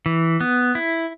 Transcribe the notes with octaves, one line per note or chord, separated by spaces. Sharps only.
E3
B3
E4